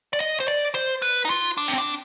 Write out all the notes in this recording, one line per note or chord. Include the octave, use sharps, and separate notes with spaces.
D5
D#5
C5
D5
C5
B4
D#4
F4
D4
C4
D4